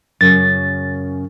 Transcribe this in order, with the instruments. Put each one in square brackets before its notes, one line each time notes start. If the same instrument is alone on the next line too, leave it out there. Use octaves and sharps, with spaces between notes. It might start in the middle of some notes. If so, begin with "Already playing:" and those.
[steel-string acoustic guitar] F#2 C#3 [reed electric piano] A6